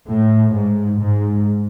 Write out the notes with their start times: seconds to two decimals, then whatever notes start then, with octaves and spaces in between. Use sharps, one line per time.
0.08 A2
0.53 G#2
0.99 G#2